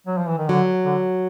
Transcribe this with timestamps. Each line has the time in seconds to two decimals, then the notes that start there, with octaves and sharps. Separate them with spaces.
0.07 F#3
0.18 F3
0.28 E3
0.38 D#3
0.49 D3 F#3
0.85 D3